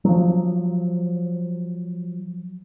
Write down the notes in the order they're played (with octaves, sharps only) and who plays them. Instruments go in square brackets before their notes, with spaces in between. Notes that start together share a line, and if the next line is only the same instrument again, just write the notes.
[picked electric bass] F3 F#3